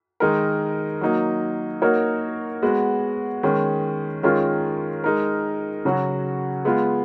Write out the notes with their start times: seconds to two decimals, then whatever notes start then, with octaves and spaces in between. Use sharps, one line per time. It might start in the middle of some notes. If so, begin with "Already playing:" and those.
0.20 D#3 G#3 D#4 A#4
1.01 F#3 A#3 D#4
1.82 A#3 D#4 F#4 A#4 C#5
2.63 G#3 B3 F#4
3.43 D#3 G#3 C#4
4.23 D#3 G#3 C#4 F4 A#4
5.04 G#3 D#4 A#4
5.85 C#3 F#3 C#4 F#4
6.65 G#3 B3 F4